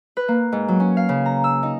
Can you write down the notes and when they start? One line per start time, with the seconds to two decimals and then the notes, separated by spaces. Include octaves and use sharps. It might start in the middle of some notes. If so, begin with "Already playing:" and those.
0.17 B4
0.28 A#3
0.52 G#2
0.68 F#3
0.80 C#4
0.97 F5
1.09 C#3
1.26 A#5
1.44 E6
1.63 D#4